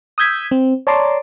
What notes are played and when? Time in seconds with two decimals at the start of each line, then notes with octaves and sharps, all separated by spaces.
0.18 D#6 E6 G6 G#6 B6
0.51 C4
0.87 C#5 D5 A5 A#5 C6 D6